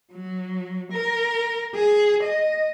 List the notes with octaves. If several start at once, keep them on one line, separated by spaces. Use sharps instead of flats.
F#3
A#4
G#4
D#5